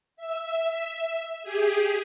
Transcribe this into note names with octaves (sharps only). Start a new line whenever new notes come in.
E5
G4 G#4